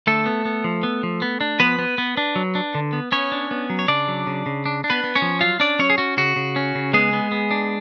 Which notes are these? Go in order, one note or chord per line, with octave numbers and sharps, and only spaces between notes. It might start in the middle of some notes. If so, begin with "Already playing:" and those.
D3 A3 A4
B3
B3
F3
B3
F3
B3
D4
F3 B3 B4
B3
B3
D4
F#3
D4
D3
B3
B3 C#4 C#5
D4
B3
F#3
C#5
C#3 D4 D5
F#3
C#3
C#3
D4
D4
B3 B4
B3
C#4 C#5
F3
F#3 F4 F5
C#4 D4 D5
F#3 C#4 C#5
G#4
C#4 F#4
C#3 F#4
C#3
C#4
C#3
G#3 B3 G#4
B3
B3
D4